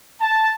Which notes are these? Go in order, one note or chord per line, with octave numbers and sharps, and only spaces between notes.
A5